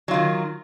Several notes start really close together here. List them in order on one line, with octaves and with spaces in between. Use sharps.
F#3 F4 D#3